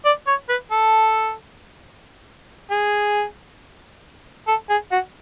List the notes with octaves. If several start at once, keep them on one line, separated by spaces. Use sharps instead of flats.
D5
C#5
B4
A4
G#4
A4
G#4
F#4